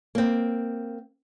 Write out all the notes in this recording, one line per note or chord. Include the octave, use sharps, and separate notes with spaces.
A#3 C4